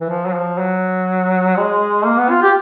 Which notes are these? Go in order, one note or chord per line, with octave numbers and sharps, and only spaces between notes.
E3
F3
F#3
F3
F#3
G#3
A#3
B3
F4
G4